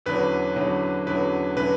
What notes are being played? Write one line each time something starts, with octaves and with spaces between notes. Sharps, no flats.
E2 D3 F#3 C#4 B4
E2 D3 F#3 C#4
E2 D3 F#3 C#4 B4
D3 F#3 C#4 B4